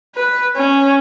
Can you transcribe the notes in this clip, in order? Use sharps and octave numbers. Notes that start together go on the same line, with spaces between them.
B4
C#4